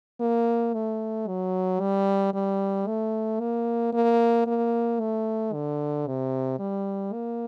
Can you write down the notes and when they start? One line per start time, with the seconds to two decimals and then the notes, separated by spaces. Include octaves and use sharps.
0.20 A#3
0.74 A3
1.28 F#3
1.80 G3
2.33 G3
2.87 A3
3.40 A#3
3.93 A#3
4.46 A#3
5.00 A3
5.53 D3
6.07 C3
6.59 G3
7.13 A#3